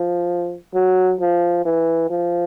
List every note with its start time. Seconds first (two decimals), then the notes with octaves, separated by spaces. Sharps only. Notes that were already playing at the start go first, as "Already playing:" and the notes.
Already playing: F3
0.74 F#3
1.20 F3
1.65 E3
2.10 F3